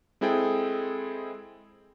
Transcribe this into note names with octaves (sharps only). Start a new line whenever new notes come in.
G#3 C4 E4 G#4 A4 G5